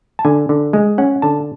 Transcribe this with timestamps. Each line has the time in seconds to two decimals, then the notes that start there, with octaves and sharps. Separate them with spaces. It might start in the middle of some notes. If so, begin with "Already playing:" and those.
0.19 A5
0.25 D3 G#5
0.49 D3
0.73 G#3
0.98 C#4 F#5
1.22 D3 A5